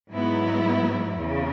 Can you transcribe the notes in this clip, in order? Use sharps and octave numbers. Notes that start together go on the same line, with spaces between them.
G#2 F#3 B3 E4
E2 C#3